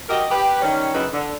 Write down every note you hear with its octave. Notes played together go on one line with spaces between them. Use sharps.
F#4 G4 A#4 D#5
G4 B4
D#3 G3 C#4
F#2 C#3 D#4 E4 B4
D3